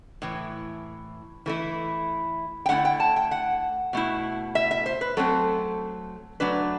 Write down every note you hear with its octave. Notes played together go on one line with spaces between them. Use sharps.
A2 E3
E3 A3 E4
G5
D3 A3 C4 E4 F#5
G5
A5
G5
F#5
B2 A3 E4
E5
E5
C5
B4
F#3 A3 C4 A4
F#3 A3 D4 B4